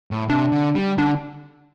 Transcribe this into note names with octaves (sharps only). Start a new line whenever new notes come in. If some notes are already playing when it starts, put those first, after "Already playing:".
A2
C3 D4
D3
G3
D3 D4